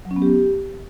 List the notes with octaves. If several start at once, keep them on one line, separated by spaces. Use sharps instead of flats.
F#3
C#4
B3
G4